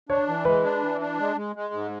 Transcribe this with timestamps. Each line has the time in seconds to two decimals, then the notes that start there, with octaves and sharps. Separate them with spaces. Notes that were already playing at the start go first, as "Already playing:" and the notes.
0.09 D4 C#5
0.28 E3
0.45 G#3 B4
0.64 D4
0.82 E3
1.01 D4
1.19 G#3
1.36 G#3
1.56 G#3
1.74 G#2